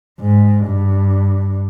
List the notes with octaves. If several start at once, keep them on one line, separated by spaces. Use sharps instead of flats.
G#2
G2